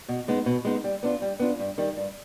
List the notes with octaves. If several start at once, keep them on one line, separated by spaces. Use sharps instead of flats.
B2
G#3 B3 D#4
B2
G#3 B3 D#4
G3
B3 D4 F4
G3
B3 D4 F4
G2
D#3 G3
G2